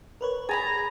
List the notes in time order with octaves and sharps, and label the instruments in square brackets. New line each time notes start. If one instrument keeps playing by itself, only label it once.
[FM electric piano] A#4 B4 C#5
[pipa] G#4 G#5 B5 [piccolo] A#5 [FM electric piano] G#6 A6